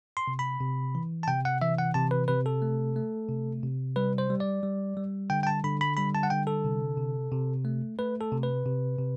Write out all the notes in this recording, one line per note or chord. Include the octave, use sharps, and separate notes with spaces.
C6
C3
B5
C3
E3
A5
C3 G5
F#5
E3 E5
F#5
C3 A5
B4
C3 B4
A4
A3
A3
C3
C3
G3 B4
C5
G3
D5
G3
G3
D3 G5
G5
A5
D3 B5
B5
G3 B5
A5
F#5
D3 G5
A4
C3
C3
C3
A3
A3 B4
A4
C3
B4
C3
C3